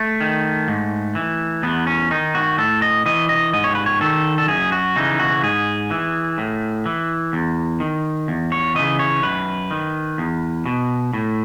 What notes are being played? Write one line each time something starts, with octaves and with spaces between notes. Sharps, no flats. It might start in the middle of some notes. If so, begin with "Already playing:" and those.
Already playing: A3
D#3
G#2
E3
E2 B3
C#4
D#3 D#4
F#4
A2 A4
D#5
E3 D#5
D#5
G#2 D#5
C#5
B4
C#5
D#3 A4
A4
F#2 G#4
F#4
C#3 E3 D#4
F#4
G#2 G#4
E3
A2
E3
E2
D#3
E2
C#5
C#3 E3 D#5
C#5
F#2 B4
D#3
E2
B2
A2